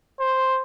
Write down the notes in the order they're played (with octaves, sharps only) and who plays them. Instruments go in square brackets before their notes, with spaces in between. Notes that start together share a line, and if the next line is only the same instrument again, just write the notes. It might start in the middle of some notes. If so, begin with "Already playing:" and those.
[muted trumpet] C5